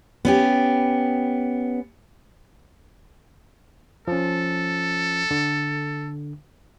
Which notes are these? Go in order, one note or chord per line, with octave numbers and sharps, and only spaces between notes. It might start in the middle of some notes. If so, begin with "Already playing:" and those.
B3 C#4 G4
F3 C#4 A4
D3